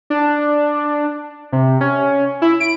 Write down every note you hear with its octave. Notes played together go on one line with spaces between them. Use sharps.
D4
C3
C#4
E4
D7